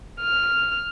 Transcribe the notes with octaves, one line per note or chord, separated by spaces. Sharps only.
F6